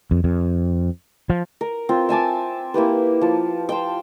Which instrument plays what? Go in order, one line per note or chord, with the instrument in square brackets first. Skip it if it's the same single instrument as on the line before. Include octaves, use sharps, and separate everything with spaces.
[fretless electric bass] F2
F2
F3
[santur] A#4
C4 F4
E5 G#5 A5 D6
A#3 E4 G4 B4
F3 A5
C5 F5 G5